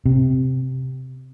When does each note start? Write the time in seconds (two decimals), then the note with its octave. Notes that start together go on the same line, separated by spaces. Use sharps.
0.06 C3